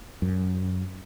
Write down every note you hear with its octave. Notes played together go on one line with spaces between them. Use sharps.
F#2